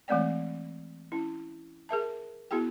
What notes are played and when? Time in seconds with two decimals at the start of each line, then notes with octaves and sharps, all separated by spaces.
0.08 E3 G#3 A3 C4 D5 G5
1.12 C#4 E4
1.89 G#4 A#4 E5 A5
2.51 B3 E4 F#4 G#4 G5